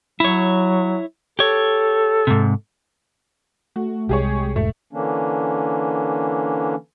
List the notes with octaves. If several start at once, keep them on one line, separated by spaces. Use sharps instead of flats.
F#3 E4 C#5
G4 A4 C#5
G#2 C3
A3 F#4
C2 G#3 G4 G#4 C#5
E1 G#2 A3
D3 E3 A#3 C#4 D4